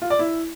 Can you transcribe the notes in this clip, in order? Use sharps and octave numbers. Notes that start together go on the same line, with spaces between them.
F4
D5
E4